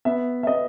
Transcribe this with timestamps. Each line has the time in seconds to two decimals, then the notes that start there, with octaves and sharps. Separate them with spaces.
0.05 B3 E5
0.43 E5
0.47 B3 D#5